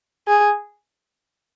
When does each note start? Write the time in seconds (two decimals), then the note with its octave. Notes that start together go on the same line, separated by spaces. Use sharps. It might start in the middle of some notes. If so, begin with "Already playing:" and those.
0.28 G#4